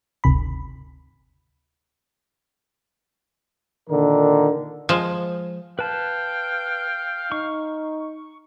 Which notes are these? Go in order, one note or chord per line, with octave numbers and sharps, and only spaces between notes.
G1 D2 C3 B5
A#2 D3 D#3 A#4
F3 G#3
B4 F5 G5 A5
D#4 C#6